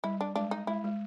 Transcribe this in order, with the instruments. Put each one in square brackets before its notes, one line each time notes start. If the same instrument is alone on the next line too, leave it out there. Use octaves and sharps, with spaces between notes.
[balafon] G3 [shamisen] E4
[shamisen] D4
[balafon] G#3 [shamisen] D4
[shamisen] D#4
[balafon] G#3 [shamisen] E4
[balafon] G#3